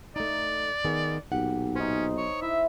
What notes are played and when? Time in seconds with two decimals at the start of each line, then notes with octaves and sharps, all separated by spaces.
0.16 A3 D#4 D5 A#5
0.85 D#3 B3 G#4
1.32 B1 A#2 G4 F#5
1.75 C#4 D#4 C5
2.18 C#5 D#5
2.42 E4 E5